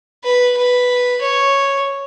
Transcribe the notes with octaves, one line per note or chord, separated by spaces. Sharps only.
B4
B4
C#5